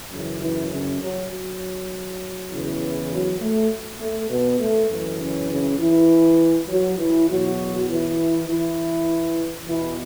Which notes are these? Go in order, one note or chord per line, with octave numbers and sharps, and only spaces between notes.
F#2 C#3 E3
E3 E4
C#3 C#4
F#3
F#3
E2 C#3 E3
F#3
A3
A3
B2 B3
A3
F#2 E3 A3
C#3 C#4
C#3 C#4
E3 E4
F#3 F#4
E3 E4
E2 B2 F#3 F#4
E3 E4
E3 E4
E2 B2 E3 E4